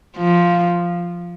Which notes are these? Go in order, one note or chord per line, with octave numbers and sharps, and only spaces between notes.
F3